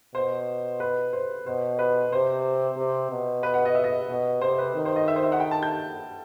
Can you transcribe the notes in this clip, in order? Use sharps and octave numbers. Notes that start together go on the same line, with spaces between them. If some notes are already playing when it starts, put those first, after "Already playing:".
B2 C5
B4
C5
B2 C5
B4
C3 C5
C3
B2
B4
F#5
D#5
E5
D#5
B2
C3 C5
B4
D#3
C5
D#5
E5
C5
E5
F#5
G5
A5
G6